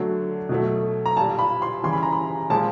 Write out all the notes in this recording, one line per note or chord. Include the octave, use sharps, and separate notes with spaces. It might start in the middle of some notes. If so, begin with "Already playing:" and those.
Already playing: D3 F#3 A3
B2 F#3 A3
A#5
A#2 G3 A5
B5
C6
C#3 E3 G3 C6
B5
A#5
B5
A#2 F3 G#3 A5